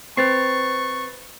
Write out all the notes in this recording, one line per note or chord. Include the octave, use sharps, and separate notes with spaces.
C4 B4 C#6 A6 C7